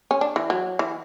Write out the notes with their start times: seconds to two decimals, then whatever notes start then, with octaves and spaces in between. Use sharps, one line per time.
0.11 C#4
0.21 D4
0.36 E3
0.50 F#3
0.79 E3